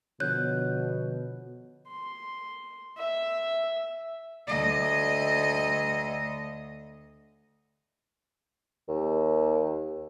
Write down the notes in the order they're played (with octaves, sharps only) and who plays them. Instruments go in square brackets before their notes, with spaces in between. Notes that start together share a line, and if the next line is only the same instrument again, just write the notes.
[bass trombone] B2 [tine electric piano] D3 F3 B3 [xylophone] C#5 F#6 G6
[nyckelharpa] C6
E5
[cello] D2 D#5
[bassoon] D#2